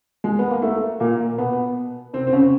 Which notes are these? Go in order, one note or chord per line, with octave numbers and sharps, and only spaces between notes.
G#3
B3
A#3
A3
A#2 A#3
B2 B3
C3 C4
C4
C#3 C#4